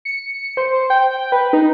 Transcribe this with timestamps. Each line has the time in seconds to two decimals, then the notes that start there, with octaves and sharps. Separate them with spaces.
0.05 C#7
0.57 C5
0.90 G5
1.32 B4
1.53 D#4